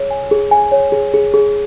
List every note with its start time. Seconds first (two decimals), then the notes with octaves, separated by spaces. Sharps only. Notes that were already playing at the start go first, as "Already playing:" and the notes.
Already playing: G#4 C#5
0.11 G#5
0.31 G#4
0.51 G#5
0.72 C#5
0.92 G#4
1.14 G#4
1.34 G#4